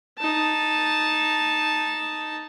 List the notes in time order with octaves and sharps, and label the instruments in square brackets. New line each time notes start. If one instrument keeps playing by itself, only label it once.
[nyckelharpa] D#4 A5